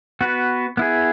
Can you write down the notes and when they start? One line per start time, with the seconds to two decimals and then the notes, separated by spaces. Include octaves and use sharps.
0.21 B3 F#4 B4
0.77 B3 E4 G#4